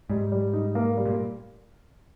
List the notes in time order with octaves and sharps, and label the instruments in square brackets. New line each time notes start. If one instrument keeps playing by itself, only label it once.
[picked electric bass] G#2 [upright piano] G3
[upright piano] G3
D#4
A#3
G3
[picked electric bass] A#2